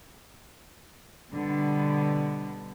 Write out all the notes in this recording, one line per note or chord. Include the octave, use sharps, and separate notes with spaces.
B2 D3 G3 B3